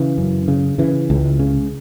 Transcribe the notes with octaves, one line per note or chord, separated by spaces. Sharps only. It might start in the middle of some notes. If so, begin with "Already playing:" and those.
Already playing: C#3 E3
F#2
C#3
C#3 E3
C#2
C#3